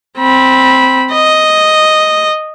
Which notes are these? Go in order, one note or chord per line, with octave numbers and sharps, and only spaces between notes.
C4 B5
D#5